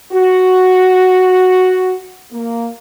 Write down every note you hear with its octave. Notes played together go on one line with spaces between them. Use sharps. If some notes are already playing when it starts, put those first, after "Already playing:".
F#4
A#3